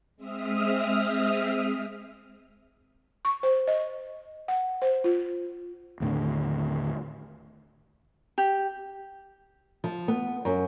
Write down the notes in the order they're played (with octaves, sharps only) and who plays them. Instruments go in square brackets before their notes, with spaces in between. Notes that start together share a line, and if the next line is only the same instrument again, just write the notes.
[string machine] G#3 C4 E5 D#6 F6
[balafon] C#6
C5
D#5
F#5
C5
F4
[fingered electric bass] D#2 A2 D3
[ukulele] G4
[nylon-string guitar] F3
B3
F#2